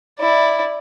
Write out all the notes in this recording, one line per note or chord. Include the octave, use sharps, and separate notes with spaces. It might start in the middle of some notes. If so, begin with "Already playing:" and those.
E4 D5